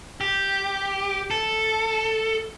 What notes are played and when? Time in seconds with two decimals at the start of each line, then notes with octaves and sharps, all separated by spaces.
0.21 G4
1.31 A4